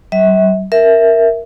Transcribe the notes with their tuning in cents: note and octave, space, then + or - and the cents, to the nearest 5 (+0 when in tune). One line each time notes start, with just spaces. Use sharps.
G3 -45 E5 -35
A#4 +0 E5 +0